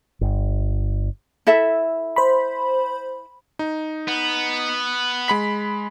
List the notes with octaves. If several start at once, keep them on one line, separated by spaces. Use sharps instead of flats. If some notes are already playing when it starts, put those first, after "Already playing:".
G1
E4 A4 E5
C5 B5
D#4
B3
G#3 B5 B6